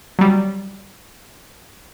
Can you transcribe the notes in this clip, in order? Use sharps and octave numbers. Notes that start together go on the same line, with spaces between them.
F#3 G3